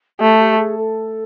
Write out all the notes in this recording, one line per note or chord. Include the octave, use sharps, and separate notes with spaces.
A3 G4
G4
G#4
A4